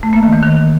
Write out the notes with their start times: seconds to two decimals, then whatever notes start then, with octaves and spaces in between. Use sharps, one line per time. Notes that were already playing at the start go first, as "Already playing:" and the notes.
0.03 A3
0.13 A#3
0.23 D#3
0.33 E3
0.43 D#3